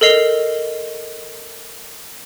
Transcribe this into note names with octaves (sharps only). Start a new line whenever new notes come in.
A4 A#4 D#5 C7 F7 G7